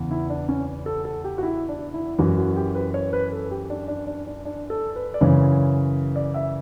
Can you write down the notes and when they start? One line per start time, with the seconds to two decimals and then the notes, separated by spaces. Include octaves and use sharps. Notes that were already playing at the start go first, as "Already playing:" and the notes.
Already playing: E2 C#3 E3
0.11 E4
0.30 D4
0.48 C#4
0.86 A4
1.05 A4
1.24 G4
1.38 F#4
1.43 E4
1.69 D4
1.94 E4
2.18 F#2 E3 F#4
2.37 F#4
2.56 G4
2.75 B4
2.94 C#5
3.13 B4
3.32 A4
3.51 G4
3.70 D4
3.88 D4
4.07 D4
4.27 D4
4.45 D4
4.70 A4
4.96 B4
5.14 D5
5.21 F#2 C#3 E3 C#5
6.16 D5
6.34 E5